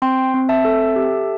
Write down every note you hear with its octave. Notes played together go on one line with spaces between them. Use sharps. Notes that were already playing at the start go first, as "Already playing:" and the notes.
C4 G5 C6
C4
E5 A5
A4
G4